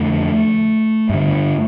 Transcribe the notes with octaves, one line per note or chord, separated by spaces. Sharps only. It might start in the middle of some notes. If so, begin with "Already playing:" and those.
Already playing: F2 D3 A3
G2 D3